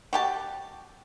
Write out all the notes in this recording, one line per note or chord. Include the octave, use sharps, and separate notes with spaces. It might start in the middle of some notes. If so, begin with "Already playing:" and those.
F#4 G4 A5